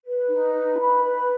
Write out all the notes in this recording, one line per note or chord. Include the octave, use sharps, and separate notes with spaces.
B4
D#4
B4
B5
B4